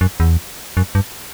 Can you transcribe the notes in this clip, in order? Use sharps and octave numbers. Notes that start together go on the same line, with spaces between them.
F#2
E2
F#2
G2